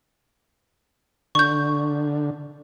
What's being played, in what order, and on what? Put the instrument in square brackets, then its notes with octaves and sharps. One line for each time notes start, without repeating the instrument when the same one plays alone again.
[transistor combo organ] D3 [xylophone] C#6 G6